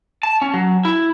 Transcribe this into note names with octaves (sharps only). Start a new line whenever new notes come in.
A5
C#4
F#3
E4